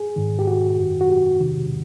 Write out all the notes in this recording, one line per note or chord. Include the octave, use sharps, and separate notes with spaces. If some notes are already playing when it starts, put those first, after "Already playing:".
Already playing: G#4
G#2 D#3
G4
F#4
F#2 D#3
F#4
G4
E2 C3 D#3